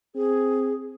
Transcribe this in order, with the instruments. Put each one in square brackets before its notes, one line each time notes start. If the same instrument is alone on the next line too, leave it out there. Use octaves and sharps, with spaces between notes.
[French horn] C4 [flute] G#4